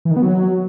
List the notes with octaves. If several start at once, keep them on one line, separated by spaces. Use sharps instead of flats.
E3
D#3
B3
F#3